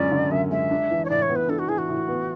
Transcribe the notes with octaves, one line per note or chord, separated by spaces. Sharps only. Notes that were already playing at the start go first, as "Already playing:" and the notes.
Already playing: F#2 D3 G#3 C#4 D5
D3
F#2 E5
G#3 E5
D4
E3
C#5
A2 D5
C#5
B3
B4
D4 A4
F#4
E3 G#4
F#4
A2
B3